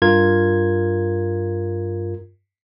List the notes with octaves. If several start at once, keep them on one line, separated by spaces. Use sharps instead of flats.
G2 F4 A#4 G#6